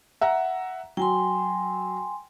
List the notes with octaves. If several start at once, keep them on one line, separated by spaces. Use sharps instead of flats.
E5 F#5 A#5
F#3 G5 G#5 C6